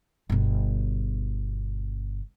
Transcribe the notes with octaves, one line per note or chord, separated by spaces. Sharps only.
G1 B2